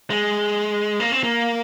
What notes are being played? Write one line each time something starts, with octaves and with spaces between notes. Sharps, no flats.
G#3
A#3
C4
A#3